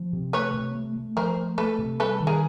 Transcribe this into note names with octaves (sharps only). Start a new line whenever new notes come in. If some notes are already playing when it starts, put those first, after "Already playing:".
Already playing: F3
C3
A3 B4 C#5
C3
A3
A3
F3 A#4 C5
A3
A3 A4 B4
C3
G3 A4 B4
D#3
G#4 A#4